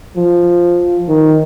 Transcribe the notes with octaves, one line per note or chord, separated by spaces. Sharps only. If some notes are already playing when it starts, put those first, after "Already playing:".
F3
D#3